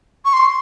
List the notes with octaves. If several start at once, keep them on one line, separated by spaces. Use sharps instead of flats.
C#6
C6